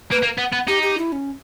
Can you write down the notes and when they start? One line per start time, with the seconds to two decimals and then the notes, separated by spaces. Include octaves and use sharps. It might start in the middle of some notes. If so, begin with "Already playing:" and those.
0.11 A#3 B4
0.22 A#3
0.38 B3
0.53 B3
0.68 D#4 G4
0.83 G4
0.98 E4
1.12 C#4